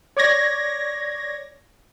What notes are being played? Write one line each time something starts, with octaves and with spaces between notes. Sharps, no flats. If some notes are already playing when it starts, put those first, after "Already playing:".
C#5 D5 G#6 A#6